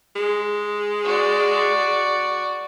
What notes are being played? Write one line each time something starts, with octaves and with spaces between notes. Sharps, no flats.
G#3
F#4 D5